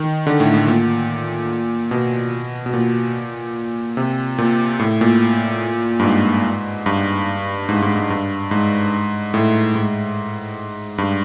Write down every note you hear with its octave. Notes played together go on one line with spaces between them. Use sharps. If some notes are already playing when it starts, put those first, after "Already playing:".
Already playing: D#3
D3
A2
A2
A#2
B2
B2
A#2
C3
A#2
A2
A#2
G2
G#2
G2
G#2
G#2
G#2
G2
G#2
A2
G#2
G2